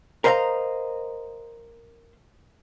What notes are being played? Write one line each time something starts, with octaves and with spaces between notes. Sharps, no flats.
A#4 C5 D#5 F5 F#5 A#5